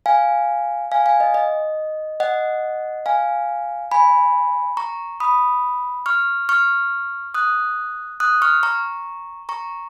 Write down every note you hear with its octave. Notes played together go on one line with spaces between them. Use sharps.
F5 G#5
F5 G#5
F5 G#5
D#5
D#5
D#5 F#5
F5 G#5
G#5 B5
A#5 C#6
B5 D#6
C#6 F6
C#6 F6
D#6 F#6
D#6 F#6
C#6 F6
A#5 C#6
A#5 C#6